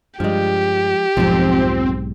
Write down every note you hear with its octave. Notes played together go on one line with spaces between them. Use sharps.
G2 F3 G3 G#3 G4
B1 F2 G#2 F3 C4